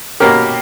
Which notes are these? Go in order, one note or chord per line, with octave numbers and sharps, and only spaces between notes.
B2 A#3 C#4 G4 A#4